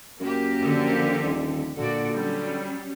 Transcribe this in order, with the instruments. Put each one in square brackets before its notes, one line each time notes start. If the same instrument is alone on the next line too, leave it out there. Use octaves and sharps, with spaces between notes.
[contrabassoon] F#2 [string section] A#3 G4
[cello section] D3 F3 C4
[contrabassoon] D#1
[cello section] A#2 F#4 D5 [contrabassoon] D3
[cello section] F#3 C#4 [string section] G3